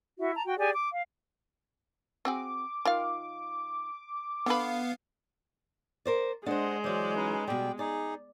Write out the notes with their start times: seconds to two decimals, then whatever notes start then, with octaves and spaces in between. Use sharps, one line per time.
0.18 E4 F#4 E5
0.34 A5 A#5
0.45 F#4 G5
0.58 G4 G#4 D5 G#5
0.75 D6
0.92 F5
2.25 C4 F#4 G#4 D6
2.85 D#3 F4 F5
4.46 D3 B3 B4 F5
6.05 A#4 C5 D5
6.46 G#3 D4 C5 D#5 F#5
6.84 E3 F#3 C5 D5
7.15 C#4 D#4 B4
7.48 B2 G3 D5 G5
7.79 D#4 G#4 D5